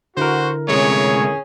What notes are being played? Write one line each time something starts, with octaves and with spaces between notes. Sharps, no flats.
D3 E4 F#4 A#4 C5
C3 G#3 A3 C#4 G#4 C#5